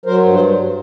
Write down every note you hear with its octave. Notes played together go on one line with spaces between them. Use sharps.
F#3 A#4 C5
G2
C5